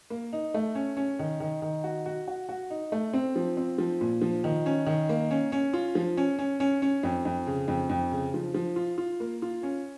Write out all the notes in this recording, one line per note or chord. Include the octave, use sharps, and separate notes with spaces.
A#3
D#4
A3
C#4
C#4
D#3
D#3
D#3
F#4
F#4
F#4
F#4
D#4
A3
C4
F3
C4
F3
A#2
F3
D#3
C#4
D#3
A#3
C#4
C#4
F4
F3
C#4
C#4
C#4
C#4
F2
F2
C#3
F2
F2
C#3
F3
F3
F4
F4
A#3
F4
C#4